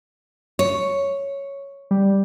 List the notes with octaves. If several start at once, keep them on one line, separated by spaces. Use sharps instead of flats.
C#5
G3